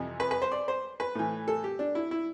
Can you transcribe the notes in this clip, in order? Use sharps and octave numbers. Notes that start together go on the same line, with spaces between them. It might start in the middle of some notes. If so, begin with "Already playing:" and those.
Already playing: F2 C3 E3
B4
B4
C5
D5
C5
B4
A2 E3
A4
G4
D4
E4
E4